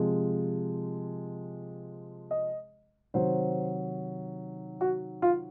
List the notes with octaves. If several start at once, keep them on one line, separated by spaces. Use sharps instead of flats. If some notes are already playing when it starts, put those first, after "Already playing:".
Already playing: C3 F3 G#3
D#5
C3 D#3 F#3 C5
F#4
F4